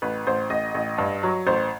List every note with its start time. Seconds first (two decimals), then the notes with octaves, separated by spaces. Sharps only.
0.02 A1 B4
0.27 A1 C5
0.50 A1 D#5
0.75 A1
0.98 G2
1.23 F#3
1.47 A1 C5